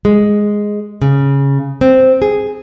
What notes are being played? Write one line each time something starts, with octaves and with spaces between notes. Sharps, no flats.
G#3
C#3
C4
G#4